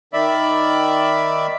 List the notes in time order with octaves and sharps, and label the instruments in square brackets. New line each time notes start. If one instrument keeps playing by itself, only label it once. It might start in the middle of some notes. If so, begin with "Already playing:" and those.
[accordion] D#3 D5 E5 B5